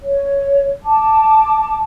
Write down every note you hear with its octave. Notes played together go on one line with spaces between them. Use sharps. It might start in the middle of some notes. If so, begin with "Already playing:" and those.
C#5
A5 D6